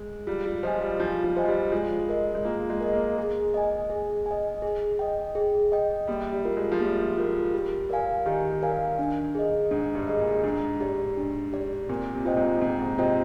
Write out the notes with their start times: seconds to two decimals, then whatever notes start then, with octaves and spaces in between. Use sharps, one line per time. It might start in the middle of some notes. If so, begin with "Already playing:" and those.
Already playing: G#3
0.27 G3 F4
0.46 G3
0.63 F3 C5 D#5 G#5
0.81 G3
0.99 F3 F4
1.24 F3
1.37 C5 D#5 G#5
1.44 F3
1.48 G3
1.72 G#3 F4
2.09 A#4 D#5
2.35 G#3
2.45 A#3 F4
2.70 G#3
2.81 A#4 D#5
2.93 A#3
3.18 G#4
3.54 D#5 G#5
3.90 G#4
4.26 D#5 G#5
4.62 G#4
4.99 D#5 G5
5.35 G#4
5.72 D#5 G5
6.07 G3 A#3
6.32 G3
6.45 F4 A#4
6.57 G#3
6.72 F3
6.80 G3 A#3
7.18 F4 A#4
7.54 G4
7.90 A#4 D5 F5 G#5
8.26 D#3 G4
8.62 A#4 D5 F5 G#5
8.99 D4
9.35 G#4 D#5
9.71 G#2 D4
9.95 G2
10.08 G#4 D#5
10.20 A#2
10.43 G#2 D4
10.80 G4 D5
11.17 D4
11.53 G4 D5
11.89 A#2 C4
12.13 C3
12.25 F4 C5 D#5 G5
12.37 G#2
12.61 G#2 C4
12.80 G#2
12.98 C3 F4 C5 D#5 G5